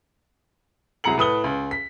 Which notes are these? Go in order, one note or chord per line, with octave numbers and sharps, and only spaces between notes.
C2 F#3 G#4 A#5 C#7 F#7
A2 B4 D#6 G7
C#2
B6